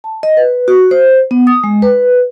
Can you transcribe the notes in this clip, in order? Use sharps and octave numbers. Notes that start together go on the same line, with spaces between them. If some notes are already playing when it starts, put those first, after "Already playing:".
A5
D#5
B4
F#4
C5
B3
D#6
G#3
B4